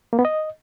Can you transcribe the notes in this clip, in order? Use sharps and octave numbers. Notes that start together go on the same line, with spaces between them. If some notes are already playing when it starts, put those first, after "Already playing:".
A#3
B3
D#5